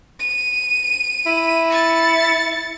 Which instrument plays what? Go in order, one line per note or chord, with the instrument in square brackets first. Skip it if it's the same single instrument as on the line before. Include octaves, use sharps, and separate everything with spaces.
[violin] D#7
[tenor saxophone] E4
[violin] A6 C#7